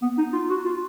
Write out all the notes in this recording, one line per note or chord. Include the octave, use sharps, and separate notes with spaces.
B3
D#4
F4
F#4
F4